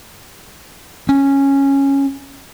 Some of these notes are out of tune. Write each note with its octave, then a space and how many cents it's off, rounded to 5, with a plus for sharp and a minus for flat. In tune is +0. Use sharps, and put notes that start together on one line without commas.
C#4 -5